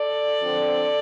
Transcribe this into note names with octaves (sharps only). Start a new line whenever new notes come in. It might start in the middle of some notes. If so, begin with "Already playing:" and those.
Already playing: A4 D5
D3 F3 C4